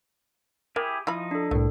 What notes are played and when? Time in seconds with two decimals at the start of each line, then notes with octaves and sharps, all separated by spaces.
0.76 E4 G4 G#4 A#4
1.07 F3 D#4 E4 F5 B5
1.31 D4 A4
1.51 C2 A2 A3